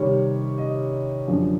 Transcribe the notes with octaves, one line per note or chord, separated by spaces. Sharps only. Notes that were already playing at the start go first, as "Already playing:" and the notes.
Already playing: C3 D#3 G3 C#5
D#5
F#2 D3 F3